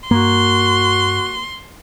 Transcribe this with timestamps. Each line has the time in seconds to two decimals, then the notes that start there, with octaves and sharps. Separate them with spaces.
0.11 G2 A#3 F#4 C6